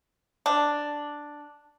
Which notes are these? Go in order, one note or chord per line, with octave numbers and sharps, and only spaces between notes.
D4